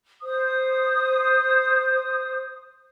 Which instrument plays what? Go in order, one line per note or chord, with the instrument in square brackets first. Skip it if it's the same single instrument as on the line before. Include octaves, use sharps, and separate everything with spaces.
[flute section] C5 D#6